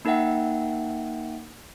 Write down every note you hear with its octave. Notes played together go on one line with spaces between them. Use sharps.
A#3 D#4 A#4 E5 F#5 G5